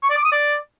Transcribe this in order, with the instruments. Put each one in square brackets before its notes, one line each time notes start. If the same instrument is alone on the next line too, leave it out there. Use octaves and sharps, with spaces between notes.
[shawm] C#6
D5
D6
D#6
D5